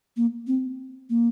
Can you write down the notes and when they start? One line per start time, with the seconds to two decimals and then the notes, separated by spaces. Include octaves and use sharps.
0.17 A#3
0.47 C4
1.10 A#3